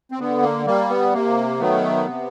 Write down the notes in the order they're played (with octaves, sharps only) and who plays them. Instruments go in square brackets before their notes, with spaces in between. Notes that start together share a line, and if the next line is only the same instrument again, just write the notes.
[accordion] C4
D3 B3
A#3
G3 A#3
B3
C3 A#3
D#3 F#3 A3 B3
C3